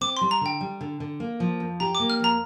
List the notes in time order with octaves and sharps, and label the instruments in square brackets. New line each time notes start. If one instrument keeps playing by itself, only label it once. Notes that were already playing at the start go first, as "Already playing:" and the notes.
[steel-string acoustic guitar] C4 [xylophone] D6
[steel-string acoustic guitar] G3 [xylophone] C6
[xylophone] A#5
[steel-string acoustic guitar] D3 [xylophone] G5
[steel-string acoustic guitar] G3
D3
D3
A#3
F3
F2
[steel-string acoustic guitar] G4 [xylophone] A#5
[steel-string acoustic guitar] A#3 [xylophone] D6
[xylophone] F6
[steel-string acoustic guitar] F2 [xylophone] A#5